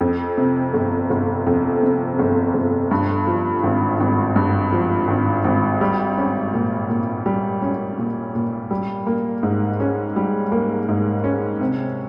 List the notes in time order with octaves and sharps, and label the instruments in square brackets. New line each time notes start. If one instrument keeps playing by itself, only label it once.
[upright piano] F2
C3
G1
G1
F2
C3
G1
G1
G2
F3
G#1
G#1
G2
F3
G#1
G#1
G3
C#4
A#2
A#2
G3
C#4
A#2
A#2
G3
A#3
G#2
C#4
G3
A#3
G#2
C#4
C3